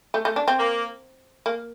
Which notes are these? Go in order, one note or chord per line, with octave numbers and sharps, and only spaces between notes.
A3
A3
D4
C4
A#3
A#3